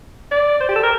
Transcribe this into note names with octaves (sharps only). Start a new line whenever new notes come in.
D5
C5
G4
A4
A#4